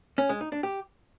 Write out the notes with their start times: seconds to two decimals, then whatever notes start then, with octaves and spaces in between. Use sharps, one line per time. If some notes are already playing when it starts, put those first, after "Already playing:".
0.18 C#4
0.29 G#3
0.41 D#4
0.52 D4
0.63 G4